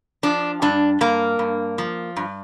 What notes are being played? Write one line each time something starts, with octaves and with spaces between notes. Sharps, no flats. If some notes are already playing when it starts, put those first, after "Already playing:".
F3 D4
G2 D4
G2 A#3
G2
F3
G2